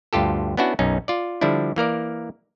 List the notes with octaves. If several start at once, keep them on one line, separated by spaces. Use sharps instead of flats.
D2 G2 F4 G4 A4
B3 C#4 D4 E4 F#4
B1 F#2 C#4 D#4
F4 D5
D3 F3 G3 D4 E4
E3 A#3 A#4 D5